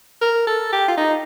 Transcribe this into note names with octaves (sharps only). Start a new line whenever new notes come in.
A#4
A4
G4
F4
D#4